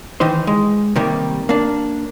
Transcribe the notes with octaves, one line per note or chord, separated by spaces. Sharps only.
D#3 E3 D#4 C5
G#3
C3 D#3 G3 A#3
A#3 D4